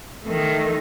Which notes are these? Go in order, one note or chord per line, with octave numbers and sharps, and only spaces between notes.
D#3 A3